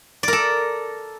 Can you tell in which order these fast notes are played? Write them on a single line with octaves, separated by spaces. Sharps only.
D5 A#4 A4